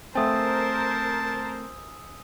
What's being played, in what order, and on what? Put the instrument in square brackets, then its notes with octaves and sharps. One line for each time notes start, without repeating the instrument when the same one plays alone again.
[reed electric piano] A3 C4 [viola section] A#4 C5 [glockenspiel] G#5 D#6 E6 [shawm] A5